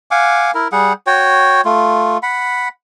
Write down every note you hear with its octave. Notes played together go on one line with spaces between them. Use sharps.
F5 F#5 G#5 D6
E4 A#4
G3 G#4 F#5
F#4 C#5 G5
A3 F4
F#5 B5